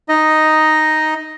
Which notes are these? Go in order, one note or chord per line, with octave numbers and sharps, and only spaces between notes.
D#4 D#5